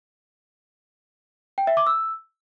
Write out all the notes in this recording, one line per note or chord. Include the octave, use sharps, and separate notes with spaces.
G5
E5
D6
E6